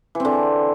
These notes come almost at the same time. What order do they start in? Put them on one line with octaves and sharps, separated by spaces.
E3 C4 D3